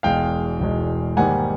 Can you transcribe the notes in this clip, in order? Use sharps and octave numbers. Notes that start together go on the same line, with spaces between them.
E1 E2 B2 G#3 F5 G5
E1 E2 B2 G#3
G#2 D#3 G3 A#3 F#5 G#5